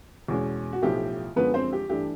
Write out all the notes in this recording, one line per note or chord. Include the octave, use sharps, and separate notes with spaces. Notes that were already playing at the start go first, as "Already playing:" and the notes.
E2 B2 G#3 C#4
F#4
B1 A2 F3 G4
F#2 D3 F3 G#3 B3 B4
C4 C5
G4
G2 E3 A3 D4 G4